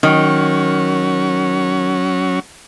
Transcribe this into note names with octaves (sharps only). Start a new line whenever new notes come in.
D#3 F#3 C#4